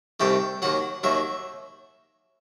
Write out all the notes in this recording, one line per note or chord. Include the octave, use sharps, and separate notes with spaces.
C2 C3 D#3 A3 G5
D#2 D#3 F#3 F#5
D#2 D#3 F#3 E5